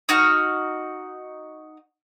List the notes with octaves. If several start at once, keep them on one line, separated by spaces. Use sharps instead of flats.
D#4 F#4 F6